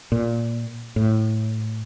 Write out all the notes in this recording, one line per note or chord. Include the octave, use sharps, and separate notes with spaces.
A#2
A2